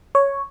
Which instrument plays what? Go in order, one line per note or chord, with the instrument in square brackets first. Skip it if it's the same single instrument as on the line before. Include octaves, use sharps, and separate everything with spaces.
[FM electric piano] C#5